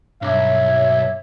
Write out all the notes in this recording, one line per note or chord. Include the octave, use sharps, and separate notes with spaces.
B1 G2 C#5 E5 D6